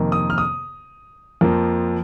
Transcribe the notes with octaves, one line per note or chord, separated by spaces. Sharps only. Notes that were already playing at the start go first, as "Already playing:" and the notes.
Already playing: F2 C3 D#3 A#3
D#6
F6
D#6
F2 F3 A#3